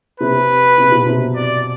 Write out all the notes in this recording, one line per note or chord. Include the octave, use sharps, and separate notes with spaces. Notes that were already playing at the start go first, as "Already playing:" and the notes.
C3 B4
C3
B2
C3
D5